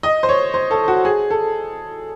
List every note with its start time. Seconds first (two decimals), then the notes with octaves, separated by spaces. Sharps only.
0.03 D#5
0.23 C5
0.29 C#5
0.54 C5
0.71 A4
0.88 F#4
1.05 G#4
1.31 A4